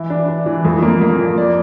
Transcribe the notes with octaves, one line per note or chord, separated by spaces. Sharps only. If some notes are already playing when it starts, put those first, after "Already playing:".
Already playing: E3 E4
D4
D4
E3
F2
A#3
A#3
F2
D5